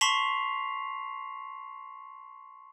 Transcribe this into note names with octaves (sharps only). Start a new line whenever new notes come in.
A5 C6 C#6 B6 C7 F7